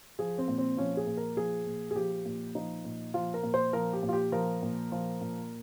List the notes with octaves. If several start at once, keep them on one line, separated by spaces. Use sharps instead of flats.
F3 G#4
C4
A#2
C4
F3 C#4
G#4
A#2
A#4
F3 G#4
A#2
G#4
F3 G4
A#2
F3 D#4
A#2
F3 F4
A#4
A#2
C5
F3 A#4
G4
A#2
F4
G4
F3 A#4
A#2
F3
A#2